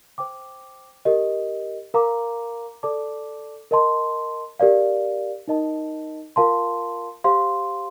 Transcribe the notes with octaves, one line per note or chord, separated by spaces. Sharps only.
C5 G5 D6
G4 A#4 D#5
A#4 F5 A#5 D6
A4 D5 A5 D6
A#4 D#5 A5 C6
G4 A#4 D5 F5
D#4 A#4 D#5 A5
F4 A#4 F5 A5 C6
G4 C5 F5 C6